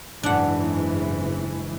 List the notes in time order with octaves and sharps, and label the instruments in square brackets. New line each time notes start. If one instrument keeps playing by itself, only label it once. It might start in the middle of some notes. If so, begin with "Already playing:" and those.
[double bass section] F#1 G#2 E3 [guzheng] D4 F#5